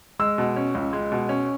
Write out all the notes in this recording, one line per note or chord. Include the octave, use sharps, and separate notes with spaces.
G#3 E6
B2
C#4
C#2
G#3
B2
C#4